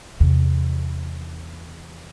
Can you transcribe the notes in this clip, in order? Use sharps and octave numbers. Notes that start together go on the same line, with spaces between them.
E2 C3